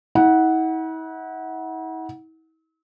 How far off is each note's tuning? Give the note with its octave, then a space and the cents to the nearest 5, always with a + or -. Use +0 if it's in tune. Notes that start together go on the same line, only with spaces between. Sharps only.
E4 -45 F#5 +0